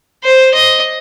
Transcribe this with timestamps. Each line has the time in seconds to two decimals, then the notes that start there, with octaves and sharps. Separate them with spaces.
0.24 C5
0.54 D#5